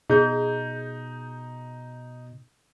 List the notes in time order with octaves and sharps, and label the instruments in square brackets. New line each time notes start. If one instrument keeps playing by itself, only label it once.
[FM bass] B2 [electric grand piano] D#4 G6 [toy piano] G#4